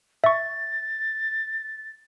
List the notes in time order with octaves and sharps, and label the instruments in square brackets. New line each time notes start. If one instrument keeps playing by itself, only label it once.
[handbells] E5 C#6 [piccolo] A6